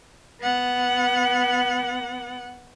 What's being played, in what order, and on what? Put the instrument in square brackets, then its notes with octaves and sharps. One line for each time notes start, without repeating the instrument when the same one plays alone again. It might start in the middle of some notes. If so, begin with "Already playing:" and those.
[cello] B3 F#5